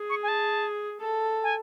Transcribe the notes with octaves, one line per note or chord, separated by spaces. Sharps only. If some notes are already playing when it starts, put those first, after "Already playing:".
Already playing: G#4
C#6
G#5
A5
A4
G#5